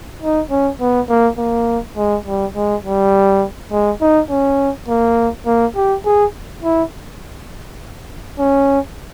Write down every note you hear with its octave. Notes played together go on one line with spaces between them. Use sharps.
D#4
C#4
B3
A#3
A#3
G#3
G3
G#3
G3
G#3
D#4
C#4
A#3
A#3
G4
G#4
E4
C#4